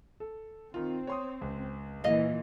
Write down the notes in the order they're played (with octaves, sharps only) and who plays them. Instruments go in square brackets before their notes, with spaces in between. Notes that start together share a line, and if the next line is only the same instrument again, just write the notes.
[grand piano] A4
[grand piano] D#3 F4 [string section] C4
[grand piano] C#5 C6 D#6
C#2
[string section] A#2 E3 [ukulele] D#5 F5